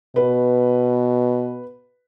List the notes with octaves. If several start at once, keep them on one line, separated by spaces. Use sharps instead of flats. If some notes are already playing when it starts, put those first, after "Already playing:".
B2 B4